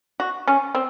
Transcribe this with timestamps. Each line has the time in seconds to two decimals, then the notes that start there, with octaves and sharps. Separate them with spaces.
0.20 F#4
0.48 C#4
0.75 C4